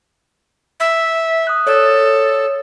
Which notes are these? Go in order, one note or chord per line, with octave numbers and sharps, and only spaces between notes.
E5
D#6 F#6
A4 C#5 D5 D#6